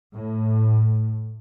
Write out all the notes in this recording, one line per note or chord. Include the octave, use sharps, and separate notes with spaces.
A2